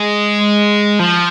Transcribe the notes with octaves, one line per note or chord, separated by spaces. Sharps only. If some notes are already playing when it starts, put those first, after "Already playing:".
Already playing: G#3
F3